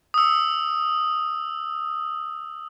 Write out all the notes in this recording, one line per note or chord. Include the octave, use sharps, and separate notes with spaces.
D#6 E6